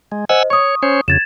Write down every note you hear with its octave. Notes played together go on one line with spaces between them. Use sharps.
G#3
C5 D#5 F#5 G#5 E6
C#5 C#6 D#6
C#4 C5 C#5
F2 C#3 G#6 A6 E7